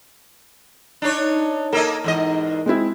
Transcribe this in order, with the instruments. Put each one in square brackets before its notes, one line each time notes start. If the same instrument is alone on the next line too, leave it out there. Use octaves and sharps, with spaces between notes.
[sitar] D4 D#4 C#5
[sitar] A#3 A4 D#5 [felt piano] A#4
[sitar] E2 G#2 D#5
[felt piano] G#3 C4 E4